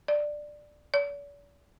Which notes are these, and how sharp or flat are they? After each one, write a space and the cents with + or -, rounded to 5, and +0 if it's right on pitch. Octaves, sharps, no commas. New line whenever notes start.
D5 +10
D5 -45